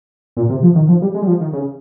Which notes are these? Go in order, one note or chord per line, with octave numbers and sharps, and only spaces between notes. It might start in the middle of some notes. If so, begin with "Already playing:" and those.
A#2
C3
F3
D#3
F3
G3
G#3
G3
F3
D#3
C#3